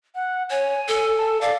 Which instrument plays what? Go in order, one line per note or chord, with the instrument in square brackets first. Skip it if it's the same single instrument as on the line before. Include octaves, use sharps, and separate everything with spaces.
[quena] F#5
[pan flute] C#5 [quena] G#5
[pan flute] A4
[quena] A5
[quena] D5 [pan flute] F5